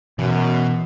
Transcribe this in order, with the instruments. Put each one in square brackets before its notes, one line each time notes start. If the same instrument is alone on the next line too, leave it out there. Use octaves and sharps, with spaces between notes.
[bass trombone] F#2 [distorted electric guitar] B2 [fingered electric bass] E3